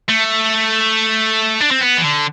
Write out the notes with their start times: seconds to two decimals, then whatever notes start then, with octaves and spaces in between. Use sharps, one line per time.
0.08 A3
1.61 D4
1.71 C4
1.81 B3
1.98 E3
2.04 D3